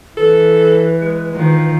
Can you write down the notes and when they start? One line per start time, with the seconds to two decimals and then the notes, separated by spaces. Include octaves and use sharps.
0.17 E3 A4 B4
1.01 G#3
1.33 D#3 F3